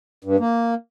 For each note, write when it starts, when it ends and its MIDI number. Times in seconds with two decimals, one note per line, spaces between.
0.24 0.36 43
0.39 0.74 58